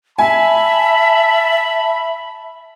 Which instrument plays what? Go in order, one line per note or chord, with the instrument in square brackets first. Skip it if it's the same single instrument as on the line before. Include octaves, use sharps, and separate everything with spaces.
[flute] E5 [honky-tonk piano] G#5 [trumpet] A5 [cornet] B5